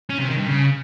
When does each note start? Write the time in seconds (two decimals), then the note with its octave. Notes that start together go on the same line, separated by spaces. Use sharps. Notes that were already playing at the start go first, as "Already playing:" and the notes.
0.09 C#4
0.19 C3
0.28 D#3
0.37 G2
0.47 C#3